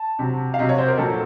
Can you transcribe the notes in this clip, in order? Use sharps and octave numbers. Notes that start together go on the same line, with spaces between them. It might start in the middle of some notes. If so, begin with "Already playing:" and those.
Already playing: A5
C3 F#3
F5
C3 F#3 D#5
C#5
C5
A#4
A#2 F#3 A4